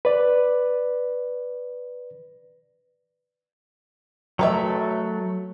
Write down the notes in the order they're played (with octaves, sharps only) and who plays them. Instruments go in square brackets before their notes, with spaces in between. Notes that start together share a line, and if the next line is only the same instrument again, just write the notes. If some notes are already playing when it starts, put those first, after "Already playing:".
[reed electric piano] B4 D5
[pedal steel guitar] F#3 A3 [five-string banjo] A#4 B4 E5